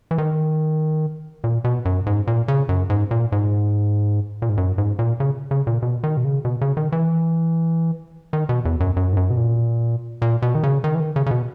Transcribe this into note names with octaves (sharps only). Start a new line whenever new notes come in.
E3
D#3
A#2
B2
F#2
G#2
A#2
C#3
F#2
G#2
A#2
G#2
A#2
G#2
F#2
G#2
A#2
C#3
C#3
A#2
B2
D#3
B2
C#3
B2
C#3
D#3
E3
D#3
B2
E2
F#2
F#2
G#2
F#2
B2
A#2
A#2
B2
D#3
C#3
D#3
E3
D#3
C#3
C#3
B2